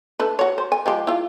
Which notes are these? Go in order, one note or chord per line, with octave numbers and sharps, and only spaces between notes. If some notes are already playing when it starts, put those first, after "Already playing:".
A3 D4 B4
F#4 C#5
C5
G#5
F3 G#3 G4
E4 F4